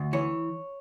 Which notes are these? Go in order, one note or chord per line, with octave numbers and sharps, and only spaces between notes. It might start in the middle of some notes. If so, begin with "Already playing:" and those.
Already playing: D2
E3 C#5